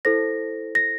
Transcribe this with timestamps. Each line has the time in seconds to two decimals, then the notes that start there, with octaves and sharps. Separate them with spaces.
0.05 E4 A4 C5 A#6
0.75 A#6